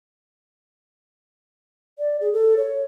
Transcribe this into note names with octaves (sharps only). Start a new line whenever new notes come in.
D5
G#4
A4
C#5